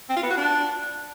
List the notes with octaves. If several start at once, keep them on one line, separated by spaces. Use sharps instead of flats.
C4
F4
B3
F#4
D4